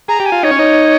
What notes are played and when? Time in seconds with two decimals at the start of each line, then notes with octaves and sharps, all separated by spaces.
0.08 G#4 A#5
0.20 G4
0.26 G#5
0.32 F4
0.43 D#4 C#5
0.51 C#4
0.59 D#4